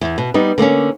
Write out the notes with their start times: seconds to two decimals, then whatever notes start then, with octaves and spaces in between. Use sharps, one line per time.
0.01 E2
0.18 B2
0.34 G3 B3 D#4
0.58 D3 A#3 C4 C#4